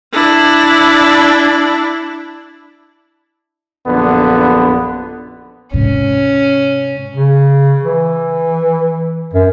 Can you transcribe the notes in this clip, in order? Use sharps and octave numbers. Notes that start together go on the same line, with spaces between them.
D4 E4
A#1 F#2 D3 B3
G#2 C3 C#4
C#3
E3
F#2